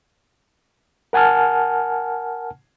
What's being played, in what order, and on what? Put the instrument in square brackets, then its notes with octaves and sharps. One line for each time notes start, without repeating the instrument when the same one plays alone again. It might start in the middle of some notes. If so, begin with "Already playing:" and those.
[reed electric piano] A#4 F#5 G#5 A5 F6